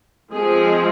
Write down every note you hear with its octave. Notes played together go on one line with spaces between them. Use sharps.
F3 G#3 C4 G#4